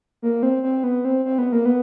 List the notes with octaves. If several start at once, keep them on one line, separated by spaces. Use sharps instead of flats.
A#3
C4
C4
B3
C4
C4
B3
A#3
B3